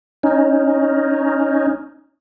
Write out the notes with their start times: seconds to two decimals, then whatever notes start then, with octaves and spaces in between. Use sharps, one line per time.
0.23 C#4 D#4